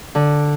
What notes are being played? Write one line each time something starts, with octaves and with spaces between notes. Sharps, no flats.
D3